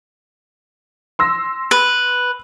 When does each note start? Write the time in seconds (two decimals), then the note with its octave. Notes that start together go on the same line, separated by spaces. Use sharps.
1.19 C6 E6 A#6
1.71 B4